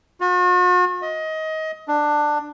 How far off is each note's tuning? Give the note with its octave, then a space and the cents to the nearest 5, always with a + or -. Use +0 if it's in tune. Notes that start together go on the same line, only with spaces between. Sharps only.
F#4 -45
D#5 +20
D4 +15